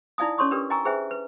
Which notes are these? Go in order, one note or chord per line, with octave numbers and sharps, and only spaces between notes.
D#4 E4 D5 F5 G#5 D#6
C#4 A4 C#5 C6 C#6 D#6
D4 G4 A#4 B4
D#5 G5 G#5 A#5 C#6 E6
G#4 B4 C5 E5 G5 G#5
B4